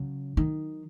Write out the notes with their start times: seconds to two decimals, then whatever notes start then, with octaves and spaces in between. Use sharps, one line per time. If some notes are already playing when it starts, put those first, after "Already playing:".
Already playing: C#3 F#3
0.37 D#3